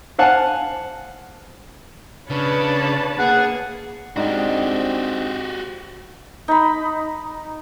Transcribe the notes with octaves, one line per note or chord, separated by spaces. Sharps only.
C5 F5 F#5 G#5 A5
C#3 D4 B4 C#5 A5
A#3 G#4 F#5
G#2 G#3 C4 D4 F#4 G4
D#4 B5